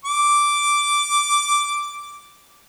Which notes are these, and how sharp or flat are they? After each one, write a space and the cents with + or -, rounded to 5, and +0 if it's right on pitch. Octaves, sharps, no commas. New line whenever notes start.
D6 -5